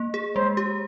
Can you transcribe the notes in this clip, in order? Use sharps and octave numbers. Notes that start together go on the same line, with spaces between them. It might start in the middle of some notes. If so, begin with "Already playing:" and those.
Already playing: A#3
G#4
G#3 C5
G4